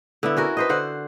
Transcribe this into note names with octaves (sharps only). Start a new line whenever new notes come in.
D3 B3 E4
C#4 F#4 A#4
B4 C5 D#5
D3 C5 F#5